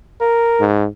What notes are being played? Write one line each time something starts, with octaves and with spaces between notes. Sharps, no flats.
A#4
G#2